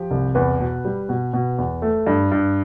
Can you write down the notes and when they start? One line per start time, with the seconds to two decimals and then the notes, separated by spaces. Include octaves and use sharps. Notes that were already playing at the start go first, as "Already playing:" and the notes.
Already playing: F3 G4
0.11 C2
0.35 E2 B4
0.60 B2
0.85 G3
1.09 B2
1.33 B2
1.58 E2
1.82 A3
2.07 G2
2.32 G2